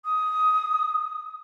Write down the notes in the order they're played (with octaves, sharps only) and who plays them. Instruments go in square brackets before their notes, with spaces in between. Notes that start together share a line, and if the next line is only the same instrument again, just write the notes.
[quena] D#6